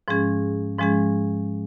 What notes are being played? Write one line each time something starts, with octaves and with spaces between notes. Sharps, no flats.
G#2 F3 G#3 C#4 G#4
G#2 F3 G#3 C#4 G#4